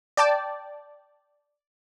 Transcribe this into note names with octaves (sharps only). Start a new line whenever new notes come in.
D5 G5 A5 D6